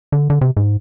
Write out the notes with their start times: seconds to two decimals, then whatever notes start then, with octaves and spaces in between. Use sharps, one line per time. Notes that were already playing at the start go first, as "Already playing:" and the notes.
0.12 D3
0.30 D3
0.41 C3
0.57 G#2